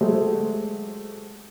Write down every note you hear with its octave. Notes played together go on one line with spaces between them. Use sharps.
F#3 G#3 A3 G4 A4 C5